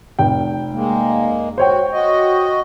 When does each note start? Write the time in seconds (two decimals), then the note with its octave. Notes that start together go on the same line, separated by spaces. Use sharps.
0.19 F1 G5
0.74 G#3 A#3
1.58 F#4 C5 C#5 G5
1.92 F#4 D#5